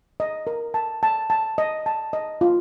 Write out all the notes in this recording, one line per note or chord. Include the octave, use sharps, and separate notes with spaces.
D#5
A#4
A5
A5
A5
D#5
A5
D#5
F4